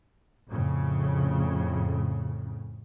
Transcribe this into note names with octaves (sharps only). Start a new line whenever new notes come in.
F2 A2 C#3